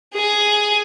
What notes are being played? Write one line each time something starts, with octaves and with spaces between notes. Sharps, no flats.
G#4 G#5